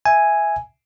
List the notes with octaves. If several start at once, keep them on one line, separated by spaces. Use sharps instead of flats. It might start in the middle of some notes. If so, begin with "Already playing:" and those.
E5 G#5